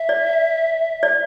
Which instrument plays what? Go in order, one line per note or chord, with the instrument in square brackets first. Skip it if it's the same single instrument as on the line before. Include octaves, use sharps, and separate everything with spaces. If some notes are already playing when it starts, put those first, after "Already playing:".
Already playing: [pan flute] E5
[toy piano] D5
D5